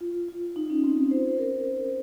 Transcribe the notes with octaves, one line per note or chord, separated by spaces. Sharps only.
F4
F4
D#4
C#4
C4
C#4
C5
A#4